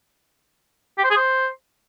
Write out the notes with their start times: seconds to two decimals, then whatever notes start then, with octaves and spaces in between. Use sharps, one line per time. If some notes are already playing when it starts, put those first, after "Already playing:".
0.98 G4
1.04 C5
1.11 G#4
1.17 C5